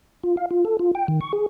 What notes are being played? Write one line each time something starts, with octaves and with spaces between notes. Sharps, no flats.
F4
F5
F4
A4
F4
G5
D#3
C#6
G#4